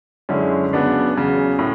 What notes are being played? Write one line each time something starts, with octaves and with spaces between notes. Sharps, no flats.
F#2 D3 G#3 C#4 E4
C#3 F#3 B3 D4
E2 C#3 F#3
A2